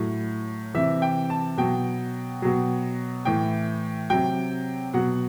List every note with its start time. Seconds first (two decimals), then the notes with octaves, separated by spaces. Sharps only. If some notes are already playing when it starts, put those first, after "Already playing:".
Already playing: A2 F#3
0.75 C3 E3 E5
1.02 G5
1.30 A5
1.58 B2 F#3 G5
2.42 B2 F#3
3.25 A2 E3 G5
4.10 C3 F#3 G5
4.93 B2 F#3 F#5